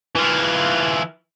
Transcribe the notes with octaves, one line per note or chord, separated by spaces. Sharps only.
E3 F4